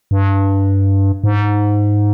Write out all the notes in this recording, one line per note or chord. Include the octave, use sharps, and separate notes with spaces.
G2
G#2